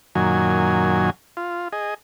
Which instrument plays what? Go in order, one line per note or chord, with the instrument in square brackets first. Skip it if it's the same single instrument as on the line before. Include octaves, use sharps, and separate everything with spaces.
[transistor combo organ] F#2 A#2 D#3 F#3 G#5
F4
G#4 D#5